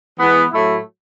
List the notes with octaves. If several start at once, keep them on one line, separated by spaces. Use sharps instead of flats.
E3 G#3 B3
A2 F#3 A3 E4